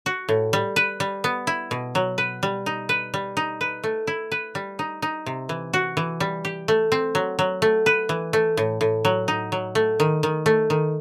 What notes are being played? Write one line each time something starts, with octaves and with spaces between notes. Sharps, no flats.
F#4
A2
G3
B4
G3
B3
E4
B2
F#3
B4
G3
D#4
B4
G3
D#4
B4
A3
E4
B4
G3
D#4
D#4
C3
E3
F#4
E3
G3
G4
A3
C4
F#3
F#3
A3
B4
E3
A3
A2
A2
F#3
D#4
F#3
A3
D#3
D#3
A3
D#3